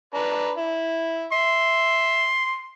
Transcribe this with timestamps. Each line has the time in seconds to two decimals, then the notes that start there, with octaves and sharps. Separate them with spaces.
0.14 D4 B4 A#5
0.57 E4
1.33 E5 C6